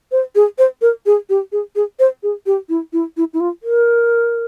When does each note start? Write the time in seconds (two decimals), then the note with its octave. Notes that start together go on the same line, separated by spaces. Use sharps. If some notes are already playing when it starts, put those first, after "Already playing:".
0.12 C5
0.35 G#4
0.58 C5
0.82 A#4
1.06 G#4
1.29 G4
1.52 G#4
1.76 G#4
1.99 C5
2.23 G#4
2.46 G4
2.69 E4
2.93 E4
3.17 E4
3.34 E4
3.40 F4
3.63 A#4